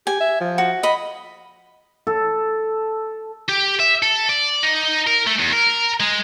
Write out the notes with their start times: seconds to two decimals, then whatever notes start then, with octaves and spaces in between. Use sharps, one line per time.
0.07 G4 G#5
0.21 E5
0.41 F3
0.58 F#4
0.83 D#5 B5
2.07 A4
3.49 G4
3.80 E5
4.03 A4
4.29 D5
4.63 D#4
5.07 A#4
5.27 A3
5.39 E2
5.53 A#4
6.00 G#3